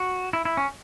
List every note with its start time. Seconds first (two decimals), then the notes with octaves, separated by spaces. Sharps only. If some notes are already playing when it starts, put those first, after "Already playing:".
Already playing: F#4
0.33 E4
0.45 E4
0.57 C#4